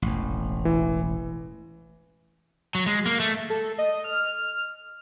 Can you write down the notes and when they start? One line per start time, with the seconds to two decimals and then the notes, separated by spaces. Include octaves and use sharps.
0.02 E1 A1
0.65 E3
2.75 F#3
2.86 G#3
3.06 A#3
3.20 A3
3.50 A4
3.78 D#5
4.04 F6